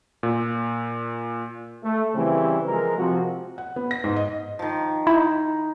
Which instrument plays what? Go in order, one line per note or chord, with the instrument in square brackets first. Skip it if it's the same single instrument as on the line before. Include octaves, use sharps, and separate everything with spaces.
[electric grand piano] A#2
[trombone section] A3
C#3 E3 G3 C4
F3 G#3 A#4
C3 F3 C4 F#4
[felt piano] F#5
B3
A#6
G#2
D#5
[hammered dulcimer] D#3 F3
[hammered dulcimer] D#4 [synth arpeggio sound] E4